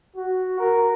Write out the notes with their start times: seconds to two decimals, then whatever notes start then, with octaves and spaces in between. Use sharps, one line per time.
0.16 F#4
0.59 A#4